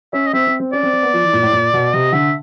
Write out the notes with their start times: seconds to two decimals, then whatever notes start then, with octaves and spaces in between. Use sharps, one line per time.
0.13 C#4 E5
0.26 D#5
0.33 C4 E5
0.47 C4
0.60 C4
0.73 C#4 D5
0.83 C4
0.93 C4
1.03 B3
1.13 F3
1.23 E3
1.33 A#2
1.43 A2
1.52 A#2
1.74 B2
1.93 C3 D#5
2.12 D3 E5